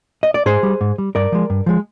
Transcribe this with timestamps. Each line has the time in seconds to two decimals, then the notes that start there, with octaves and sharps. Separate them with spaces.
0.23 D#5
0.34 D5
0.46 G#2 G#4 C5
0.63 G3
0.81 G#2
0.98 G3
1.15 G2 A#4 D5
1.32 F3 G#3
1.50 G2
1.66 F3 G#3